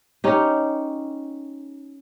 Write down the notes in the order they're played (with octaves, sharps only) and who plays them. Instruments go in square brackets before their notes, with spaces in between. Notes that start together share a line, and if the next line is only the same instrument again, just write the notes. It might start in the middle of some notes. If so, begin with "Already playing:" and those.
[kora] C#4 D#4 G4